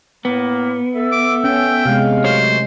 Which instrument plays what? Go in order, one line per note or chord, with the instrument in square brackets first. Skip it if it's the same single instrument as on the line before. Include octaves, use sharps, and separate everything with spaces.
[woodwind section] A2 A#3 [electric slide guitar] B3
[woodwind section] A4 E5
[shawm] D6
[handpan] C#4 [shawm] G5
[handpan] C3 G#3 [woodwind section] F5
[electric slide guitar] F#3 A3 C#5 [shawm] C5